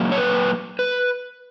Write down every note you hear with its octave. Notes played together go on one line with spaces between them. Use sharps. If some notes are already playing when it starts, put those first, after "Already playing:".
Already playing: A#2 F#3 A#3
C#5
B4
B4